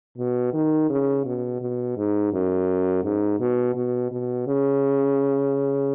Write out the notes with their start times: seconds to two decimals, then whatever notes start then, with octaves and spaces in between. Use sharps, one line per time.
0.18 B2
0.54 D#3
0.90 C#3
1.26 B2
1.61 B2
1.97 G#2
2.33 F#2
3.04 G#2
3.40 B2
3.76 B2
4.11 B2
4.47 C#3